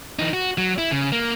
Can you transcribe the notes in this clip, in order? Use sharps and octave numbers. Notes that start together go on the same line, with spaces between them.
E3 D#4
F#4
F#3
E4
C#3
A#3